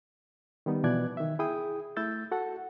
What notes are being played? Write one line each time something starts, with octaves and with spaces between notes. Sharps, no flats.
D#3 G3 B3 D#4
B2 E3 F3 D5 F#6 G#6
D#3 E5
E4 G#4 G5 D#6
A3 E4 E6 G6 A6
F#4 A4 F#5